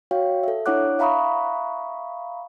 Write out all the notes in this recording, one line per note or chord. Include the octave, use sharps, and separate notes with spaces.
F#4 C#5 F5 G5
A4 E5
D4 E4 C#5 F#5 D6 F#6
E5 F5 A#5 B5 C#6 D#6